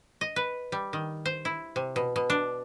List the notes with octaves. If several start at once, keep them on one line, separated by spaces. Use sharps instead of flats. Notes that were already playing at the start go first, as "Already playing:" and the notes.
D#5
B4
G3
D#3
C5
E4
C3
B2
B2
D4